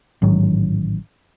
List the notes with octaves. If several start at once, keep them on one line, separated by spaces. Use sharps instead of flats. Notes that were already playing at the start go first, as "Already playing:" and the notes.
A1 G#2 D#3 F#3